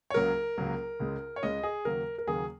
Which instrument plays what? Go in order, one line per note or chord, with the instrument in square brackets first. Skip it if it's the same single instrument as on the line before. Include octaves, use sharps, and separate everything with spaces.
[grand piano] C#5
C#2 C#3 F#3 A#3 A#4
C#2 C#3 F#3 A#3
C#2 C#3 G#3
C#5
C#2 C#3 G#3 D#5
G#4
D#2 C#3 F#3 A#3 A#4
A#4
D#2 C#3 F#3 A#3 G#4